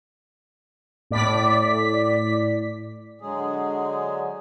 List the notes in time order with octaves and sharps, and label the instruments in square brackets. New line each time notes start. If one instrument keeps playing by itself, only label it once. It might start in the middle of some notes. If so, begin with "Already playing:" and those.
[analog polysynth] A2 D5 B6
[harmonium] D3 F#3 G#3 G#4